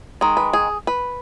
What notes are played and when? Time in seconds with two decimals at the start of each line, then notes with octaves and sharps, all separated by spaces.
0.21 D#3 G#3
0.37 B4
0.53 G#4
0.87 B4